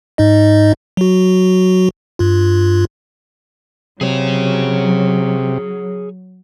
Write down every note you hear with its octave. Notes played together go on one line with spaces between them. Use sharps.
G#2 D#4 D#5
F#3 F#4
G2 F4
C3 F#3 G#4 C#5